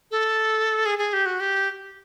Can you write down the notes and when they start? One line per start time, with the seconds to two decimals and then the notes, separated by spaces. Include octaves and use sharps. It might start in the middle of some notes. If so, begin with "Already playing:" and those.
0.11 A4
0.86 G#4
0.98 G#4
1.13 G4
1.26 F#4
1.40 G4